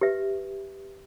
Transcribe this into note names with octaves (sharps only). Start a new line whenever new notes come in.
G4 B4 E5